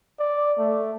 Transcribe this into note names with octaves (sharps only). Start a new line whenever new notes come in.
D5
A3